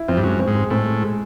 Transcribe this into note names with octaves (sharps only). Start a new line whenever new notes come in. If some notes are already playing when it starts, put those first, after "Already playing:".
Already playing: E4
F2 C4
G2
F#2 G#3
C4
G#2
G#3
A2 C4
G#3
G#3